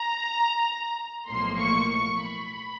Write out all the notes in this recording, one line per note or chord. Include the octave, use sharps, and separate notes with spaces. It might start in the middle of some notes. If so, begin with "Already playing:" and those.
Already playing: A#5
B1 A2 F3 A#3 C6
C#6
C#6
B5